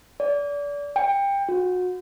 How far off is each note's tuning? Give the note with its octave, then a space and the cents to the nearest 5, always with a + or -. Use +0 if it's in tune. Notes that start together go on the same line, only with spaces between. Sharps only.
D5 -30
G5 +25
F#4 -30